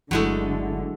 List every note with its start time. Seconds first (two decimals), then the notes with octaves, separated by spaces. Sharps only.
0.11 G1 D3 F#3 G#3 A3 E4